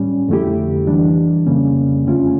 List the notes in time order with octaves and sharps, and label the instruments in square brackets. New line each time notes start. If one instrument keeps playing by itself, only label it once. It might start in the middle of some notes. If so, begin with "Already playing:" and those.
Already playing: [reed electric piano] A2 G3 C#4
F2 D3 A3 E4 G4
E3 G3 D4
F2 C#3 G3 A#3 C#4
E2 D3 A3 C#4 F4